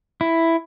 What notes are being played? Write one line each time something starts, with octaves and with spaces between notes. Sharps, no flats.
E4